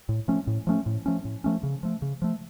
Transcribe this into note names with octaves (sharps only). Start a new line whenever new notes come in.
A2
F3 A3 C#4
A2
F3 A3 C#4
A2
F3 A3 C#4
A2
F3 A3 C#4
C#3
F3 A3
C#3
F3 A3